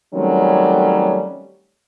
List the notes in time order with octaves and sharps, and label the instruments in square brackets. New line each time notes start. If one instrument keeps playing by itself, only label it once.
[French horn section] D#3 F#3 G3 A3 C4 C#4